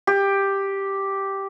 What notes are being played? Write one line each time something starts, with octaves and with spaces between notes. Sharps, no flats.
G4